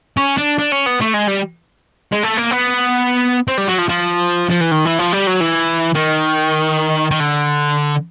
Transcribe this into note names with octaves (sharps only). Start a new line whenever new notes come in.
C#4
D4
D4
C#4
B3
A3
G#3
G3
G#3
A3
A#3
B3
C4
G3
F#3
F3
F3
F3
E3
D#3
E3
F3
G3
F#3
E3
D#3
D#3
D3